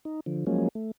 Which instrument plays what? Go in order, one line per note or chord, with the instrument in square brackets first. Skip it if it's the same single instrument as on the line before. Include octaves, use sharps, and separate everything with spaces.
[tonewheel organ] D#4
D3 F3
F3 F#3 G#3 A#3 C#4
A3